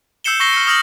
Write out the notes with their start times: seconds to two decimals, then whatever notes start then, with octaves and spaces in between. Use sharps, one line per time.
0.24 E6 G6 C7 C#7 E7 G7
0.40 C#6 E6 A#6 C7 G7
0.53 F6 C#7
0.67 D#6 F6 G6 A#6 F#7